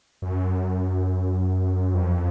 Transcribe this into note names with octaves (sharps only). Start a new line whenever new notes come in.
F#2
F2